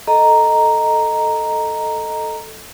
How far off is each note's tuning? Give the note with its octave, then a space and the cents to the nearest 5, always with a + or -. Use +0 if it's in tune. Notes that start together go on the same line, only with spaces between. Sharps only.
A4 +0 D#5 +0 A#5 +0